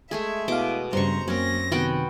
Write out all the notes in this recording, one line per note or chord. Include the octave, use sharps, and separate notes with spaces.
G#3 A3 G#4 E5
B2 E4 D#5 F5 D6
G2 C#3 G3 C5 A#5 C#6
F#2 F#3 A#3 C4 C#4 A#6
C3 D#3 B3 F#4 G5